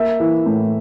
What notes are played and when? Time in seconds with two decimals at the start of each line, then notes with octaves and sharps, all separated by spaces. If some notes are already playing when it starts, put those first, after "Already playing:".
Already playing: A#3 E5
0.20 E3
0.46 A2